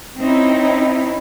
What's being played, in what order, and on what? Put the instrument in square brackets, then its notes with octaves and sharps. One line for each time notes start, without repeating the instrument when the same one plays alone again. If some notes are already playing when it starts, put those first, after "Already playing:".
[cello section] C4 C#4 D#4 E4